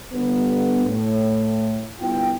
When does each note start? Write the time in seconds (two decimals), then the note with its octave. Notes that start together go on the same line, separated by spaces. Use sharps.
0.13 G1 B3
0.86 A2
2.00 G1 C2 B3 E4 F4 G5